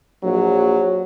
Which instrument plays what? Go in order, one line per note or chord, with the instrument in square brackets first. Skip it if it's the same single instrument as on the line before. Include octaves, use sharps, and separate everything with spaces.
[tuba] A#1 [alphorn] F#3